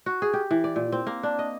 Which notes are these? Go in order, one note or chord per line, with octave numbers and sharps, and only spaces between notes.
F#4
G#4
G4
E3
D5
A#2
C4
A#3
D4
D#5